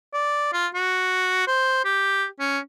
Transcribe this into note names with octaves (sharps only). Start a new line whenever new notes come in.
D5
F4
F#4
C5
G4
C#4